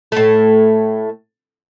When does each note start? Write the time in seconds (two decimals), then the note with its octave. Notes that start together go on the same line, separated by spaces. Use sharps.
0.12 A2 A3